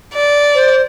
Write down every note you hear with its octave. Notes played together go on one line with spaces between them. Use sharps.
D5
C5